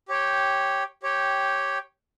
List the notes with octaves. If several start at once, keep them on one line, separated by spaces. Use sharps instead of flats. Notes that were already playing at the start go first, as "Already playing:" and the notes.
G4 C#5 G5
G4 C#5 G5